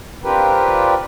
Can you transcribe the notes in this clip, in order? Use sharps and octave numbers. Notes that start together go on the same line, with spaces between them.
C4 D4 F4 G4 A#4 B4